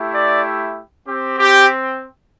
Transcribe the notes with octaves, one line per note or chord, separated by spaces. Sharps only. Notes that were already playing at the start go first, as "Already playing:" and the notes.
Already playing: A3 E4 G4
D5
C4 G4
G4